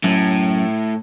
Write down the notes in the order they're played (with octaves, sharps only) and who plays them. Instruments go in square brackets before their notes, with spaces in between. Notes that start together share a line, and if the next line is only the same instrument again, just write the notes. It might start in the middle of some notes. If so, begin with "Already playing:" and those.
[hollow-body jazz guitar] F#2 [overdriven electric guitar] A2